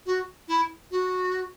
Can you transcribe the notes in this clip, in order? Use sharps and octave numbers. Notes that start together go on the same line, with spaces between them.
F#4
E4
F#4